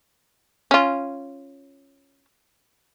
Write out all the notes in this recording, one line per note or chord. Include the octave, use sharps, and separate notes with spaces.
C#4 F4